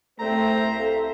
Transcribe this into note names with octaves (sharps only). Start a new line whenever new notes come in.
C2 A3 C4 C5 E5 A#5
A4 F5